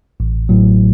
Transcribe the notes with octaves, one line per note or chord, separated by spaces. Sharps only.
A1
A2 F#3